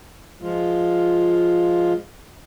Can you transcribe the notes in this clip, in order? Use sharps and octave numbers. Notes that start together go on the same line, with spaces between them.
F3 G#3 F4